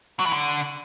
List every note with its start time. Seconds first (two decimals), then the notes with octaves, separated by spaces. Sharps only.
0.20 F#3
0.26 E3
0.32 D3